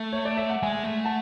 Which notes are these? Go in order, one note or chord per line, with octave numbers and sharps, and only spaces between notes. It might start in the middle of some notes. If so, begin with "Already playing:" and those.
Already playing: A3 E5
C#5
D5
E5
F#5
G#3 E5 G#5
A3
F#5 A5